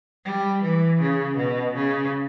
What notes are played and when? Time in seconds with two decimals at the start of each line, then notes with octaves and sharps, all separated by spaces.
0.25 G3
0.62 E3
1.00 C#3
1.37 B2
1.74 C#3